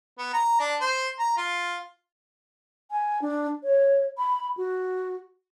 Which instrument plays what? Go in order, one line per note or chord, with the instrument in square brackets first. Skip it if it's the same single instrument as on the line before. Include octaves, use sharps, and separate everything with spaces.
[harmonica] B3
A#5
D4
C5
A#5
F4
[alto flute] G#5
D4
C#5
B5
F#4